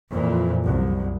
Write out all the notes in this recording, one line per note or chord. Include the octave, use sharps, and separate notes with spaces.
F2 A#2 E3
C2 F#2